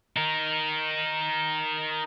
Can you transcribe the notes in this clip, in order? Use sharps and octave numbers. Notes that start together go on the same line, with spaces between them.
D#4 A#4